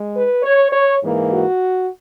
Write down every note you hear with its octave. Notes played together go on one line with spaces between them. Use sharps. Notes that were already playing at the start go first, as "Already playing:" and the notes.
Already playing: G#3
B4
C#5
C#5
G#2 E3 A#3
F#4